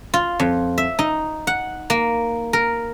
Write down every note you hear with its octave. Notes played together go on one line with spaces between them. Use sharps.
F4
F2
E5
D#4
F#5
A#3
A#4